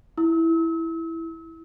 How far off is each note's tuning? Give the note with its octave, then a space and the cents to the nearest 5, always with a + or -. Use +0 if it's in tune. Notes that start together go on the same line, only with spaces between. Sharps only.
E4 +0 E6 -40